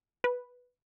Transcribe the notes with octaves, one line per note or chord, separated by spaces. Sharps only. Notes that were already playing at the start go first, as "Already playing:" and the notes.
B4